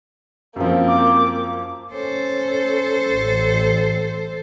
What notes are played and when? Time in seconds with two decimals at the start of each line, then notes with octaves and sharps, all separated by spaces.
0.56 F#2 F3 A#3 C4
0.88 D6
1.93 C#4 A4 C5
3.12 A1